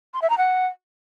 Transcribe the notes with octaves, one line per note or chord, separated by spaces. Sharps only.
C6
E5
A#5
F#5